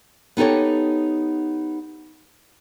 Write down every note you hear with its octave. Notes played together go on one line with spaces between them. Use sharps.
B3 D#4 G4 A4 C#5